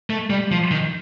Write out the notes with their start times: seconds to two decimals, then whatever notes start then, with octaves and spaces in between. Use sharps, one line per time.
0.10 A3
0.30 G3
0.51 F3
0.71 D#3